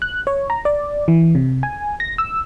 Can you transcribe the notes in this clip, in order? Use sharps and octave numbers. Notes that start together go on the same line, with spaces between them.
F#6
C#5
A#5
D5
E3
C3
G#5
A#6
E6